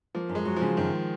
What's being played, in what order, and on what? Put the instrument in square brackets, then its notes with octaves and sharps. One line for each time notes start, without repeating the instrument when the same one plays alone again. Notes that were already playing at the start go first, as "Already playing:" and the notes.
[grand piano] F3 [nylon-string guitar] A#3
[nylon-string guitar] F#2
[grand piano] G#3
[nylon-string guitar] F#3
[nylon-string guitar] C#3 [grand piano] F3
[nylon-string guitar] F#2 [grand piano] D#3